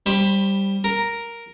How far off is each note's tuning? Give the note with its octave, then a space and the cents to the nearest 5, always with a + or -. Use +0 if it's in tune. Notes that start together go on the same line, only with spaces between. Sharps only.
G3 +0 C5 +25 B5 +0
A#4 +0 A#5 +0